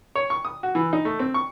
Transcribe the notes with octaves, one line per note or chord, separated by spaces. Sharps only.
C#5
C#6
D#6
F#4
E3
D#4
A3
C4
C#6